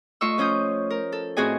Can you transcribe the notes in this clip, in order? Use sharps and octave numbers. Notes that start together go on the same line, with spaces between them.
A3 F4 D#5 C#6 E6
F3 C#4 F4 D#6 G6
A#4
A4
A2 C4 F#4 G#4 D#5 G#5